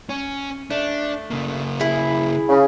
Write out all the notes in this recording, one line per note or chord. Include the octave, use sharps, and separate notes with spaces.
C#4
A3 D4
C#3 A#3
E4 G#4
C#3